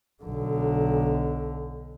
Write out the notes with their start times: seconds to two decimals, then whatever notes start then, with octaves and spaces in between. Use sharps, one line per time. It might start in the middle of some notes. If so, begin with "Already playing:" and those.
0.24 B1 D3